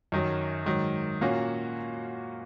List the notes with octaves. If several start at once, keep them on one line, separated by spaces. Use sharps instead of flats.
F#2 D#3 F#3
G#2 D#3 F#3
A#2 A#3 C#4 F#4